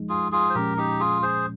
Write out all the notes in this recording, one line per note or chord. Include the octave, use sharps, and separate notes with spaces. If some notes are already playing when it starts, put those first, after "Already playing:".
Already playing: F3 G#3 D#4
F4 G#4
F4 G#4
C5
A#2 F3 G#3 C#4 G4 A#4
D#4 G4
F4 G#4
G#4 C5